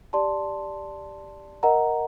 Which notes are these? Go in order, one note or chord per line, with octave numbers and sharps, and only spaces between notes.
G4 D5 A5 C6
A#4 D#5 F#5 A#5